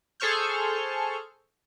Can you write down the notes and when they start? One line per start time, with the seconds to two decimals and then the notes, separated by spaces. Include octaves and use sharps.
0.20 G#4 A4 C5 C#6 F6 G6